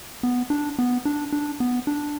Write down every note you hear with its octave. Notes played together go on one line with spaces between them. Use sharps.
B3
D4
B3
D4
D4
B3
D4